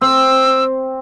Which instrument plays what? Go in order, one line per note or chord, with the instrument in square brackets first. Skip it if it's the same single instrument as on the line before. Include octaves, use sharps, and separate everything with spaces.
[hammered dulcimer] C4 [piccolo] E6